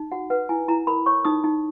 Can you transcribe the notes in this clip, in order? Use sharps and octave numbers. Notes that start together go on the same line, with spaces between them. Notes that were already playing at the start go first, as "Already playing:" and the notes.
Already playing: D#4
F#4 F#5
B4 F#5
E4 G#5
E4 A#5
A#4 B5
C#5 C#6
D#4 D#6
D#4